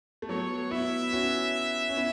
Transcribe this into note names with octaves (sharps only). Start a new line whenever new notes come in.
A3
F#3 B3 C#5
B3 E4 E5
C#4 F#4
C#4
B3 E4